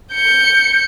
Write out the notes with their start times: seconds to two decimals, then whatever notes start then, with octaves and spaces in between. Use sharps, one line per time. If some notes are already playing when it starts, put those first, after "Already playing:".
0.13 G6 C#7